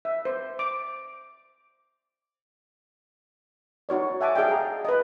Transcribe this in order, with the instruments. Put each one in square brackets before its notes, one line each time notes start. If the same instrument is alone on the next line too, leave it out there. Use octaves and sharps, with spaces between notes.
[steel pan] E5
C5
D6
D#4 F#4 C#5 D5
E5 F#5 G#5 A5 D6
G#4 D5 D#5 G5
G#4 F5 A#5
B4 D#5